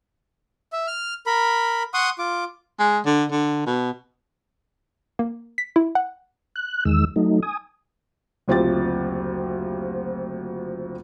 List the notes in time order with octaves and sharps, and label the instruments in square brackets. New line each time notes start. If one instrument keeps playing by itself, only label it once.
[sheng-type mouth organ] E5
F6
A#4 B5
F#5 C6 C#6 D#6
F4 D6
[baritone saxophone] G#3
D3
D3
B2
[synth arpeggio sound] A#3
B6
E4
F#5
[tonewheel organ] F#6
E2 D#3 G#3 E6
F#3 A3 D#4
G#5 D#6
[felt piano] F#1 D2 C4 F4 G4 A6